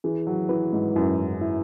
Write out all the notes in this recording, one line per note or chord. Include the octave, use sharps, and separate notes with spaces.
E3 G#4
F#3
E3 B4
G#2
F#2 E4
E4